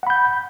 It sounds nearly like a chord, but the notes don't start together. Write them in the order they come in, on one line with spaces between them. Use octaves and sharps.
F#5 B5 G6